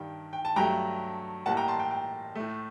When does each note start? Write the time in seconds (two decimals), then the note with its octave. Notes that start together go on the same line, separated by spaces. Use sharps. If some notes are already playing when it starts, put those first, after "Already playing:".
Already playing: G2 D#3 G3 G5
0.33 G5
0.45 A5
0.56 G2 F#3 A3 G5 A#5
1.46 A2 G3 A#3 F#5 A5
1.57 G5 A#5
1.68 A5 C6
1.80 G5
1.91 G5
2.35 A2 A3